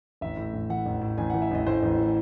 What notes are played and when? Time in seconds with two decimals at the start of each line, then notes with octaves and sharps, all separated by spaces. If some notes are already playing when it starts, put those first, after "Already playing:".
0.21 A1 E5
0.37 A2
0.54 A1
0.70 E3 F#5
0.86 A1
1.02 A2
1.18 A1 G#5
1.30 F#5
1.34 E3
1.42 E5
1.51 A1 D#5
1.67 A2 C5
1.83 A1
1.98 E3